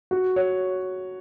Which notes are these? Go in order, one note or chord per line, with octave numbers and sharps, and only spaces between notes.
F#4
C#5